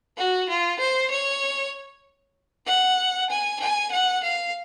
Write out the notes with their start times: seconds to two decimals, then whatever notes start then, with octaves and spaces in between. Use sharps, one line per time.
0.18 F#4
0.50 F4
0.80 C5
1.11 C#5
2.67 F#5
3.30 G#5
3.60 G#5
3.92 F#5
4.24 F5